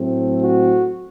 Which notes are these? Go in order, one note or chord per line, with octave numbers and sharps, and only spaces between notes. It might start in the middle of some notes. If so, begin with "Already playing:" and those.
Already playing: A2 F#3 A3 C4
F#4